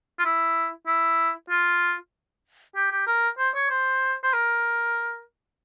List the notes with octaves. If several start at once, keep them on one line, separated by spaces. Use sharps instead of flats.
F4
E4
E4
F4
G4
G4
A#4
C5
C#5
C5
C5
A#4